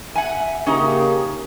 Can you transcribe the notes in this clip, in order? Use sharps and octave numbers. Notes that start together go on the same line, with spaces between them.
E5 F#5 G#5
C#3 A#3 C#4 D#4 G4